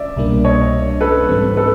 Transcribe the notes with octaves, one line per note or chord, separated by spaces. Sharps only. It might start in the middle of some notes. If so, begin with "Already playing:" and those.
Already playing: D5 E5
C2 B2 G3 A#3 D4
C#5 D#5
A4 B4
G#2 E3 G3 C4
A4 B4